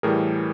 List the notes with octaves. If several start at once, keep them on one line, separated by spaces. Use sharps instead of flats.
A2 E3 G3 G#4 A#4